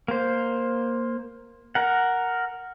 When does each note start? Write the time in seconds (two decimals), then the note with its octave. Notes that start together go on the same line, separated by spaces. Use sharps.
0.08 A#3 C5
1.75 A#4 F#5